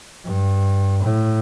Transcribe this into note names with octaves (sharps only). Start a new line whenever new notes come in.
G2
A2